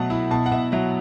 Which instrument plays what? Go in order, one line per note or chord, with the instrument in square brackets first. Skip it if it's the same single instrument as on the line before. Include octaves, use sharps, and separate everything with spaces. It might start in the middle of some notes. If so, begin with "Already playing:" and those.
Already playing: [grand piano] B2 F#3 A3 E5 F#5 A5
E4
B2 A5
F#5
B2 E5
F#3 E5